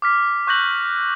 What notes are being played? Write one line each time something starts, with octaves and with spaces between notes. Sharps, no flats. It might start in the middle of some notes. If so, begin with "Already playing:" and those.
D6 F6 B6
C#6 F#6 G6 A#6 F#7